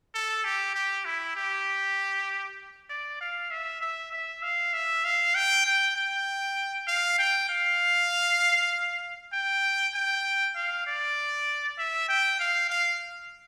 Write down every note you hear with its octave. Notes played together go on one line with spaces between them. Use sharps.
A4
G4
G4
E4
G4
D5
F5
E5
E5
E5
F5
E5
F5
G5
G5
G5
F5
G5
F5
G5
G5
F5
D5
E5
G5
F5
F5